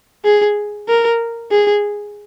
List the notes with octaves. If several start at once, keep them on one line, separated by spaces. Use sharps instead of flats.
G#4
A#4
G#4